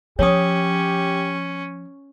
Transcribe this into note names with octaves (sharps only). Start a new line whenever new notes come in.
F3 C#4 G4 C#5 D#6